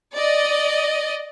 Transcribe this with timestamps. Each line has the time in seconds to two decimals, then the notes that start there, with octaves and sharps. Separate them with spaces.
0.14 D5 D#5